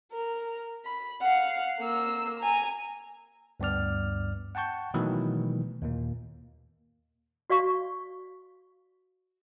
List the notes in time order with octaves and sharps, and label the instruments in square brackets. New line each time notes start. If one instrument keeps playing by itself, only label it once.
[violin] A#4
B5
F5 F#5
A#3 E6
G#5 A#5
[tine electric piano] D2 G2 B3 D5 F6
F#5 G5 A5 C#6 G6
B2 D#3 E3 F#3 A3 A#3
D#2 A#2 A#3
[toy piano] F#4 D5 F5 C#6